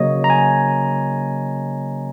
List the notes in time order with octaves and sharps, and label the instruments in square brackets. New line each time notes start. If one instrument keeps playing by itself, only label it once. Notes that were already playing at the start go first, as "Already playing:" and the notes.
Already playing: [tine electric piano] C#3 F#3 A#3 C#5 D#5
A#5
G#5